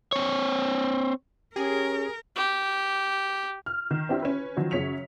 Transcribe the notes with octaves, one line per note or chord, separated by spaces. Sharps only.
C4 C#5
C#4 G4 G#4 A#4
G4
F6
D#3
C4 D4 E4 G4
C#4 B4
D#3 F3 F#3
F#2 C#3 C#5 B6 C#7 F7